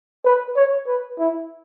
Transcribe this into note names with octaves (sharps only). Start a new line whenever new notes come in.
B4
C#5
B4
E4